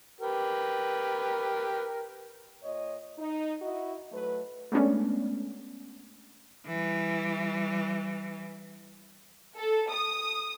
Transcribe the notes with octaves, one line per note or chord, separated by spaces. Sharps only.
G4 A#4 B4
A#2 C#5 D#5
D#4
E4 F#4 D#5
F#3 A3 B4
G#3 A3 B3 C#4 D4
E3 G3
A4
D#6